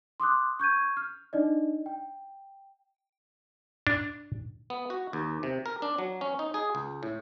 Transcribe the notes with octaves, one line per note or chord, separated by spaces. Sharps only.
C6 D6 D#6 F#6
C#6 G6 G#6 D#7
F6
D4 D#4 D5 D#5
G5
D4
B3
F#4
D#2
C3
A#4
D4
F#3
C#4
D#4
G#4
C#2
A2